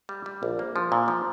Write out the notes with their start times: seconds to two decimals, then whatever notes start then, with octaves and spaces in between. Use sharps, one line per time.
0.09 G3
0.26 G3
0.43 A#1
0.59 A#3
0.76 F3
0.92 A#2
1.08 F3